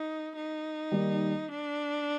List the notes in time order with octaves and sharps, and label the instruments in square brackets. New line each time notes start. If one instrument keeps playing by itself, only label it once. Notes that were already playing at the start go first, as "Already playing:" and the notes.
Already playing: [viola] D#4
D#4
[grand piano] D#3 G3 A#3
[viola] D4